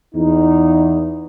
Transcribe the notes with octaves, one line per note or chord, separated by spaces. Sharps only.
E2 D#4